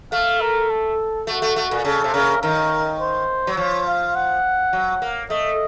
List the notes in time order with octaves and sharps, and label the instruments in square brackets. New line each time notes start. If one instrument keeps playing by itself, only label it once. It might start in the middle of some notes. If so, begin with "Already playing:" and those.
[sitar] A3 [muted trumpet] F5
[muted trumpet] A#4
A4
[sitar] A3 [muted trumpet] F#4
[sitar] A3
A3
A#2
[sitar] C#3 [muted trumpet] A4
[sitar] C3
[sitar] C#3 [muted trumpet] A#4
[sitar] D#3 [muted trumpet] A#4
[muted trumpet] C5
[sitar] F#3
[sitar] F3 [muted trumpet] C#5
[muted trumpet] F5
F#5
[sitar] F#3
A#3
[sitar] A3 [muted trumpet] D#5